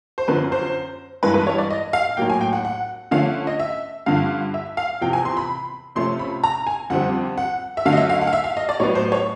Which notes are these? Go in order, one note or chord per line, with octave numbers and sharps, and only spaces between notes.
C5
F#2 D3 F3 B4
C5
G2 E3 G#3 B4
B4
C#5
D5
D#5
F5
A2 F#3 A#3 G5
G#5
G5
F#5
F#5
D3 F3 A3 C#4 F5
D#5
E5
G2 D3 F3 F5
E5
F5
E2 C3 F3 G5
G#5
C6
B5
C3 F3 A3 C#4 C6
B5
A#5
G#5
F2 D3 G3 C4 F#5
F#5
E5
D3 F#3 A3 F5
D#5
E5
F5
F#5
F5
E5
F5
D#5
D5
A2 F#3 B3 C#5
C5
C#5